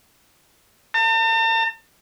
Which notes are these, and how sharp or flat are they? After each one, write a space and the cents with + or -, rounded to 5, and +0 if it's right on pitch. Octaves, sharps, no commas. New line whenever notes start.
A5 +45